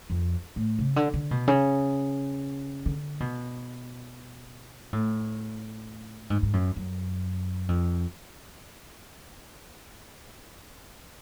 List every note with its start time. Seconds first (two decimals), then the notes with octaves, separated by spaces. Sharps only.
0.10 F2
0.56 A2
0.79 C#3
0.96 D3
1.14 D3
1.31 B2
1.47 C#3
2.86 D3
3.20 B2
4.93 A2
6.30 G#2
6.43 G#2
6.53 F#2
6.76 F#2
7.68 F2